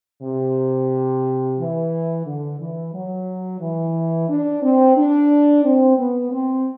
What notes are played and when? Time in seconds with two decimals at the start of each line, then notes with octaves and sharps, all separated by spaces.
0.23 C3
1.58 E3
2.25 D3
2.59 E3
2.93 F#3
3.60 E3
4.29 D4
4.62 C4
4.97 D4
5.64 C4
5.98 B3
6.31 C4